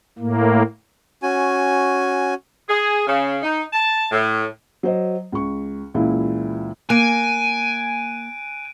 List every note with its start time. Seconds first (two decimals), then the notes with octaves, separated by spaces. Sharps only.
0.19 A2 A#3
1.23 C#4 F#4 G#5
2.68 G#4
3.06 C#3
3.43 D#4
3.73 A5
4.11 A2
4.83 F#3 C5 D#5
5.32 C#2 C#6
5.94 C#2 A#2 E3 E4
6.90 A#3 G#5 F#6 D7 D#7